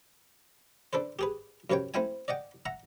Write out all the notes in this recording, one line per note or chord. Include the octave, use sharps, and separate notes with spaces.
D4 A4 B4 C5
G4 G#4 B4
F#2 C3 B4 C#5 G5
A3 C4 E4 E5 G5 G#5
D5 D#5 F#5 G5
E5 F#5 A#5